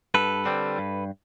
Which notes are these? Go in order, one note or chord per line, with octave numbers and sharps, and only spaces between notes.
G2 A4 B4
D3 G3 C4
G2